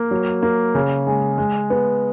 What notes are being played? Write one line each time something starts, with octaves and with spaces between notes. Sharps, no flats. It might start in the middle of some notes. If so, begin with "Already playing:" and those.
Already playing: A#3
F#3
A#3
C#3
G#3
G#3
B3